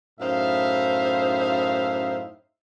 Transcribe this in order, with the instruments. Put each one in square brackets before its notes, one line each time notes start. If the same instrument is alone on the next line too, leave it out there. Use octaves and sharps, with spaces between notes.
[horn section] F#2 A2 D#4 C5 E5 F5